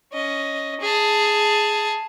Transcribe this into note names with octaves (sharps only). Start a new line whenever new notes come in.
C#4 D#5
G#4 A5